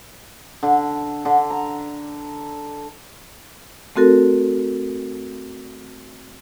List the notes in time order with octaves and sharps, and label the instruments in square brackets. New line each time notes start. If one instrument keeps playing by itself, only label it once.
[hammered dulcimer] D3
D3
A#5
[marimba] A3 C4 F#4 A4 A#4